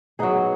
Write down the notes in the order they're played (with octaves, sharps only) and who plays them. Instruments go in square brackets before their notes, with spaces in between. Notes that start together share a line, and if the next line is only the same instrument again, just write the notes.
[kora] F#3 B3 D#4 G#4